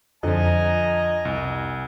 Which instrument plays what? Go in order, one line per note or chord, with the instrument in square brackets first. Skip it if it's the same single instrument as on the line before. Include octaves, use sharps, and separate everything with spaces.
[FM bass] F2 [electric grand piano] D3 F3 [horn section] D#5 G#5 A#5
[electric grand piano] C2